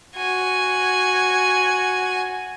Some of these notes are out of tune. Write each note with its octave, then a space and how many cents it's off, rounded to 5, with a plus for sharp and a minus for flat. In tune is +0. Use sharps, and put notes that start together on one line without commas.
F#4 +0 G#5 +0